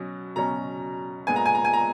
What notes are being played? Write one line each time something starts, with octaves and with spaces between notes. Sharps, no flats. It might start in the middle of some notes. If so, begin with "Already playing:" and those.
Already playing: B2 F#3 C#4
B2 F#3 C#4 A#5
A#2 G#3 B3 G#5
A#5
G#5
A#5
G#5
A#5